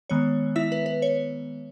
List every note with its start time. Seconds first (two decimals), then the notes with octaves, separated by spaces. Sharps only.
0.10 D#3 G#3 B3 C#5
0.56 E4 E5
0.72 B4
0.86 B4
1.02 C#5